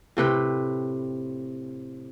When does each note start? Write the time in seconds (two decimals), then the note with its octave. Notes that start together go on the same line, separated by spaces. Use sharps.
0.17 A2 C3 B4 G5